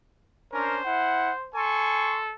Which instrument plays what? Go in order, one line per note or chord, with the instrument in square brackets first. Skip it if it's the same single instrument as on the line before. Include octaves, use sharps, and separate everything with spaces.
[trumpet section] C#4 D4 A#4 [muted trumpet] C5
[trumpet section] E4 F#5
[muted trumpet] A4 [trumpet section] G#5 C6 C#6